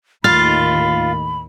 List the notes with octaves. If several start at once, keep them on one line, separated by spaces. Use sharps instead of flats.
D#2 A2 D#3 F4 B5 F6 A6